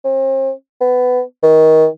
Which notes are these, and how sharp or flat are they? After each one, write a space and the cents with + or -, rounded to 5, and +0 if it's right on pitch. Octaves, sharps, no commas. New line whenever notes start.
C4 +40
B3 +15
D#3 +25